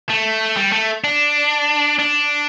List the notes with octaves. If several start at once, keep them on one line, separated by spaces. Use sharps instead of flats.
A3
G3
A3
D4
D4